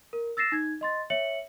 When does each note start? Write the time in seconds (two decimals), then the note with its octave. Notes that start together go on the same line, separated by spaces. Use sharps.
0.13 A#4
0.37 E6 A6 A#6 C7 E7
0.52 D#4 G#6
0.81 D#5 C6 A6
1.10 C#5 E5 C#7 F#7